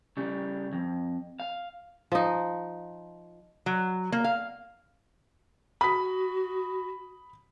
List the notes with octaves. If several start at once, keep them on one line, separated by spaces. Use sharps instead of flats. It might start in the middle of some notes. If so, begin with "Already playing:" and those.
C#3 G3
F2
F5
F3 D#4
F#3
A#3
F5
F#4 B5 D#6 B6